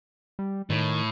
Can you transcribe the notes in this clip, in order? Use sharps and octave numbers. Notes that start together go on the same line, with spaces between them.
G3
A2 D#3